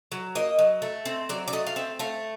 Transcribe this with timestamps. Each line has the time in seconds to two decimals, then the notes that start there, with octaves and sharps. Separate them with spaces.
0.12 F#3
0.35 A#3 D#5
0.59 F#3
0.82 A3
1.05 C4
1.29 F#3 D5
1.48 D5
1.53 A3 D#5
1.67 F5
1.76 C4 E5
1.99 A3 F5